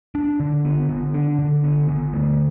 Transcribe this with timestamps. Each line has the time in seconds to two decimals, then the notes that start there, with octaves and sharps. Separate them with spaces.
0.15 D4
0.40 D3
0.65 B3
0.89 D3
1.14 D4
1.39 D3
1.64 B3
1.89 D3
2.13 A3